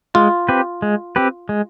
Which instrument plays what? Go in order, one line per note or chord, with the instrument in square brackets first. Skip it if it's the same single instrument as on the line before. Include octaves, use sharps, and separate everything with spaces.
[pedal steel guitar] G#3 [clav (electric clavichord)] F4
[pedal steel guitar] C4 G4 B4
G#3
C4 G4 B4
G#3